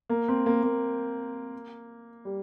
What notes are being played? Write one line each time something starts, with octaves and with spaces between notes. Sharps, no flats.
A#3
C4
A#3
A#3
G3